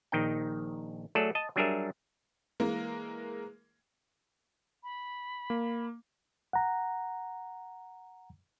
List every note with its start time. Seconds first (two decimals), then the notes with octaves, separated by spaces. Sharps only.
0.12 A#1 D#3 D#4 G5
1.15 F#3 A3 G#4 A4 D5
1.35 D#5 A5
1.56 F#3 G3 D4 G#4 A#4 E5
2.60 E3 G#3 A#3 A#4
4.83 B5
5.50 A#3
6.53 F#5 A#5